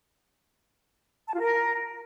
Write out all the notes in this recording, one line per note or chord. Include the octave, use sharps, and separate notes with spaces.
A5
F4
A#4